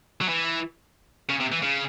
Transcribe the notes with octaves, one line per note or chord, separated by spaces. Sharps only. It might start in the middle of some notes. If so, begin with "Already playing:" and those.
F#3
E3
C#3
C3
E3
C#3